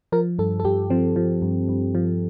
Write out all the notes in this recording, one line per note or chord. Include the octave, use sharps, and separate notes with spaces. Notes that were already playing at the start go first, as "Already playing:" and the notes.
F3 A#4
G2 A4
A4
G2 G4
F3 C4
F3
G2
G2
F3